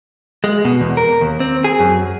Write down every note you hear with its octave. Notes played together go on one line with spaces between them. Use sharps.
G#3
B2
E2
A#4
D#2
C4
G#4
F#2